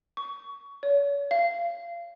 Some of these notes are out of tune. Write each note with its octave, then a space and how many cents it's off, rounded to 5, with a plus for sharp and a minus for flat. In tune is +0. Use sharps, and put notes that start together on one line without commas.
C#6 +20
C#5 +35
F5 -25